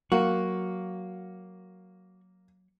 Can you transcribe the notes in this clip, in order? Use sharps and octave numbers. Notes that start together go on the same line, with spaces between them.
F#3 A#3 F#4